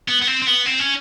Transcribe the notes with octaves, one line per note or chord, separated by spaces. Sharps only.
B3
B3
C4
C4
B3
C4
C#4